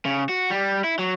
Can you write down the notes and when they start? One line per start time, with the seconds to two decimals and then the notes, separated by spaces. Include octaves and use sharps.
0.05 C#3
0.29 F#4
0.50 G3
0.84 E4
0.99 F#3